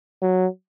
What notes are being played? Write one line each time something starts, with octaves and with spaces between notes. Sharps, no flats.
F#3